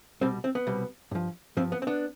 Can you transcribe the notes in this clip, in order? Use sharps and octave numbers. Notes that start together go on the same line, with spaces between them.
C2 B2 G3 C4
C4
B3
C2 B2 G3
G2 F3
G2 F3 C4
B3
C4
B3 D4